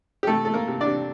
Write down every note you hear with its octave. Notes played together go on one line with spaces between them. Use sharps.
G4
C3 A3 A4
A3 A4
A#3 A#4
C3
D4 D5
C3